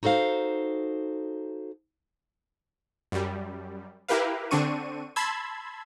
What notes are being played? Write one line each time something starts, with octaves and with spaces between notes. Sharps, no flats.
D#4 F#4 A4 C5 F5
F#2 G3
E4 G4 A#4 B4 F5
D3 C4 D4 C#6 D#7
A5 B5 C6 E6 G#6